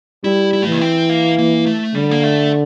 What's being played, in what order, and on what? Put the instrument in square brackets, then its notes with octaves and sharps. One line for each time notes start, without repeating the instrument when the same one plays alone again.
[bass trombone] G3 [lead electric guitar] E4
[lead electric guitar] E4
[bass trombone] E3 [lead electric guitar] A3
[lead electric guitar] A#3
C4
A#3
A#3
A3
[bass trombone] D3 [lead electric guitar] G3
[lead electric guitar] A#3
A3